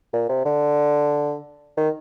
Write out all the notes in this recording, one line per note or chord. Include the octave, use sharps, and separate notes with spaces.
A#2
C3
D3
D#3